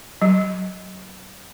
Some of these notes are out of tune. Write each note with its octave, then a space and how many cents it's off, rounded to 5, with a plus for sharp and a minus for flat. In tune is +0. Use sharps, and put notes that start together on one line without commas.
F#3 +15